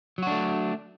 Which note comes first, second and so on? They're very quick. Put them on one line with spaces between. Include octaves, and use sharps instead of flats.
F#3 F#4 D4 A3